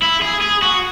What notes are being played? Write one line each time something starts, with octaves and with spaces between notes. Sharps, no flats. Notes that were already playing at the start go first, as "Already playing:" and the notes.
E4
G#4
G#4
F#4